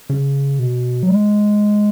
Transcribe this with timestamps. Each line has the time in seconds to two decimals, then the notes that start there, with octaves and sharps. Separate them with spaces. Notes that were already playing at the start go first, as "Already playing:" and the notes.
0.10 C#3
0.59 B2
1.03 F#3
1.10 G#3